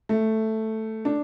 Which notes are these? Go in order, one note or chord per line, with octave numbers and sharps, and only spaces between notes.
A3
D4